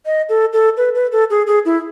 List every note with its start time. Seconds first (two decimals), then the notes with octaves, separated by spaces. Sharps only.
0.06 D#5
0.29 A4
0.53 A4
0.77 B4
0.95 B4
1.12 A4
1.30 G#4
1.47 G#4
1.65 E4